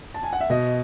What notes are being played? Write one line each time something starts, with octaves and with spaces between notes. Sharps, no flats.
A5
G#5
F#5
E5
B2 D#5